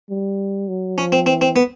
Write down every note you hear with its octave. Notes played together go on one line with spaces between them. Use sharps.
G3
F#3
F3 C#4
C4
E3 C4
C4
B3